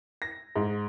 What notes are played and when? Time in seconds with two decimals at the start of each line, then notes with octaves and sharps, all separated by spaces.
0.22 A#6
0.56 G#2